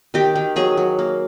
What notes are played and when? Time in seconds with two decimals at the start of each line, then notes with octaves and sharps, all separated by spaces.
0.14 D#3 G4
0.35 D#3
0.56 F#3 G#4
0.77 F#3
0.99 A#3